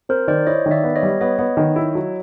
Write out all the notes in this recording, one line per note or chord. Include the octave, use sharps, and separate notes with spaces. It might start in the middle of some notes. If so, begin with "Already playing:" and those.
C4 A#4 C5
D#3 C5 D5
E4 C#5 D#5
D#3
D5 E5
B3
C#5 D#5
G3
B3 C#5 D#5
B3
D#3
E4
F#3